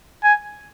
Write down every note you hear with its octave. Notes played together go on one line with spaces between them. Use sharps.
G#5